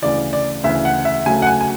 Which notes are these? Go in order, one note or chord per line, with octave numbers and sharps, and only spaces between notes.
D2 C#3 E3 D5
D5
D2 C#3 E3 E5
F#5
E5
D2 C#3 F#3 A3 G#5
F#5
G#5
G#5